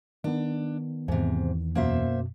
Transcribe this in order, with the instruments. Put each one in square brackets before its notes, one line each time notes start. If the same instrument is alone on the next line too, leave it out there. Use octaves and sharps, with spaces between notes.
[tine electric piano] D#3 B3 [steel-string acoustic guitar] D4
[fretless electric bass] E2 [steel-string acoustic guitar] G#2 C3
[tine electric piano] F#2 B2 [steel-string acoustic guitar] A#3 C5 E5